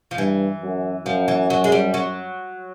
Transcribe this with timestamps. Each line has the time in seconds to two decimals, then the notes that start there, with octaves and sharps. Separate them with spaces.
0.11 F3
0.18 G2 E3
0.62 F#2
1.06 F#2 F3
1.28 E3
1.50 F#3
1.64 G#3
1.72 G3
1.94 F#3